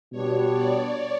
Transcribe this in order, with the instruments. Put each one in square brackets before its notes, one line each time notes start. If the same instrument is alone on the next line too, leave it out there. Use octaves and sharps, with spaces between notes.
[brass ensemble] B2 G3 B3 D4 [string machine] C#5
[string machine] D5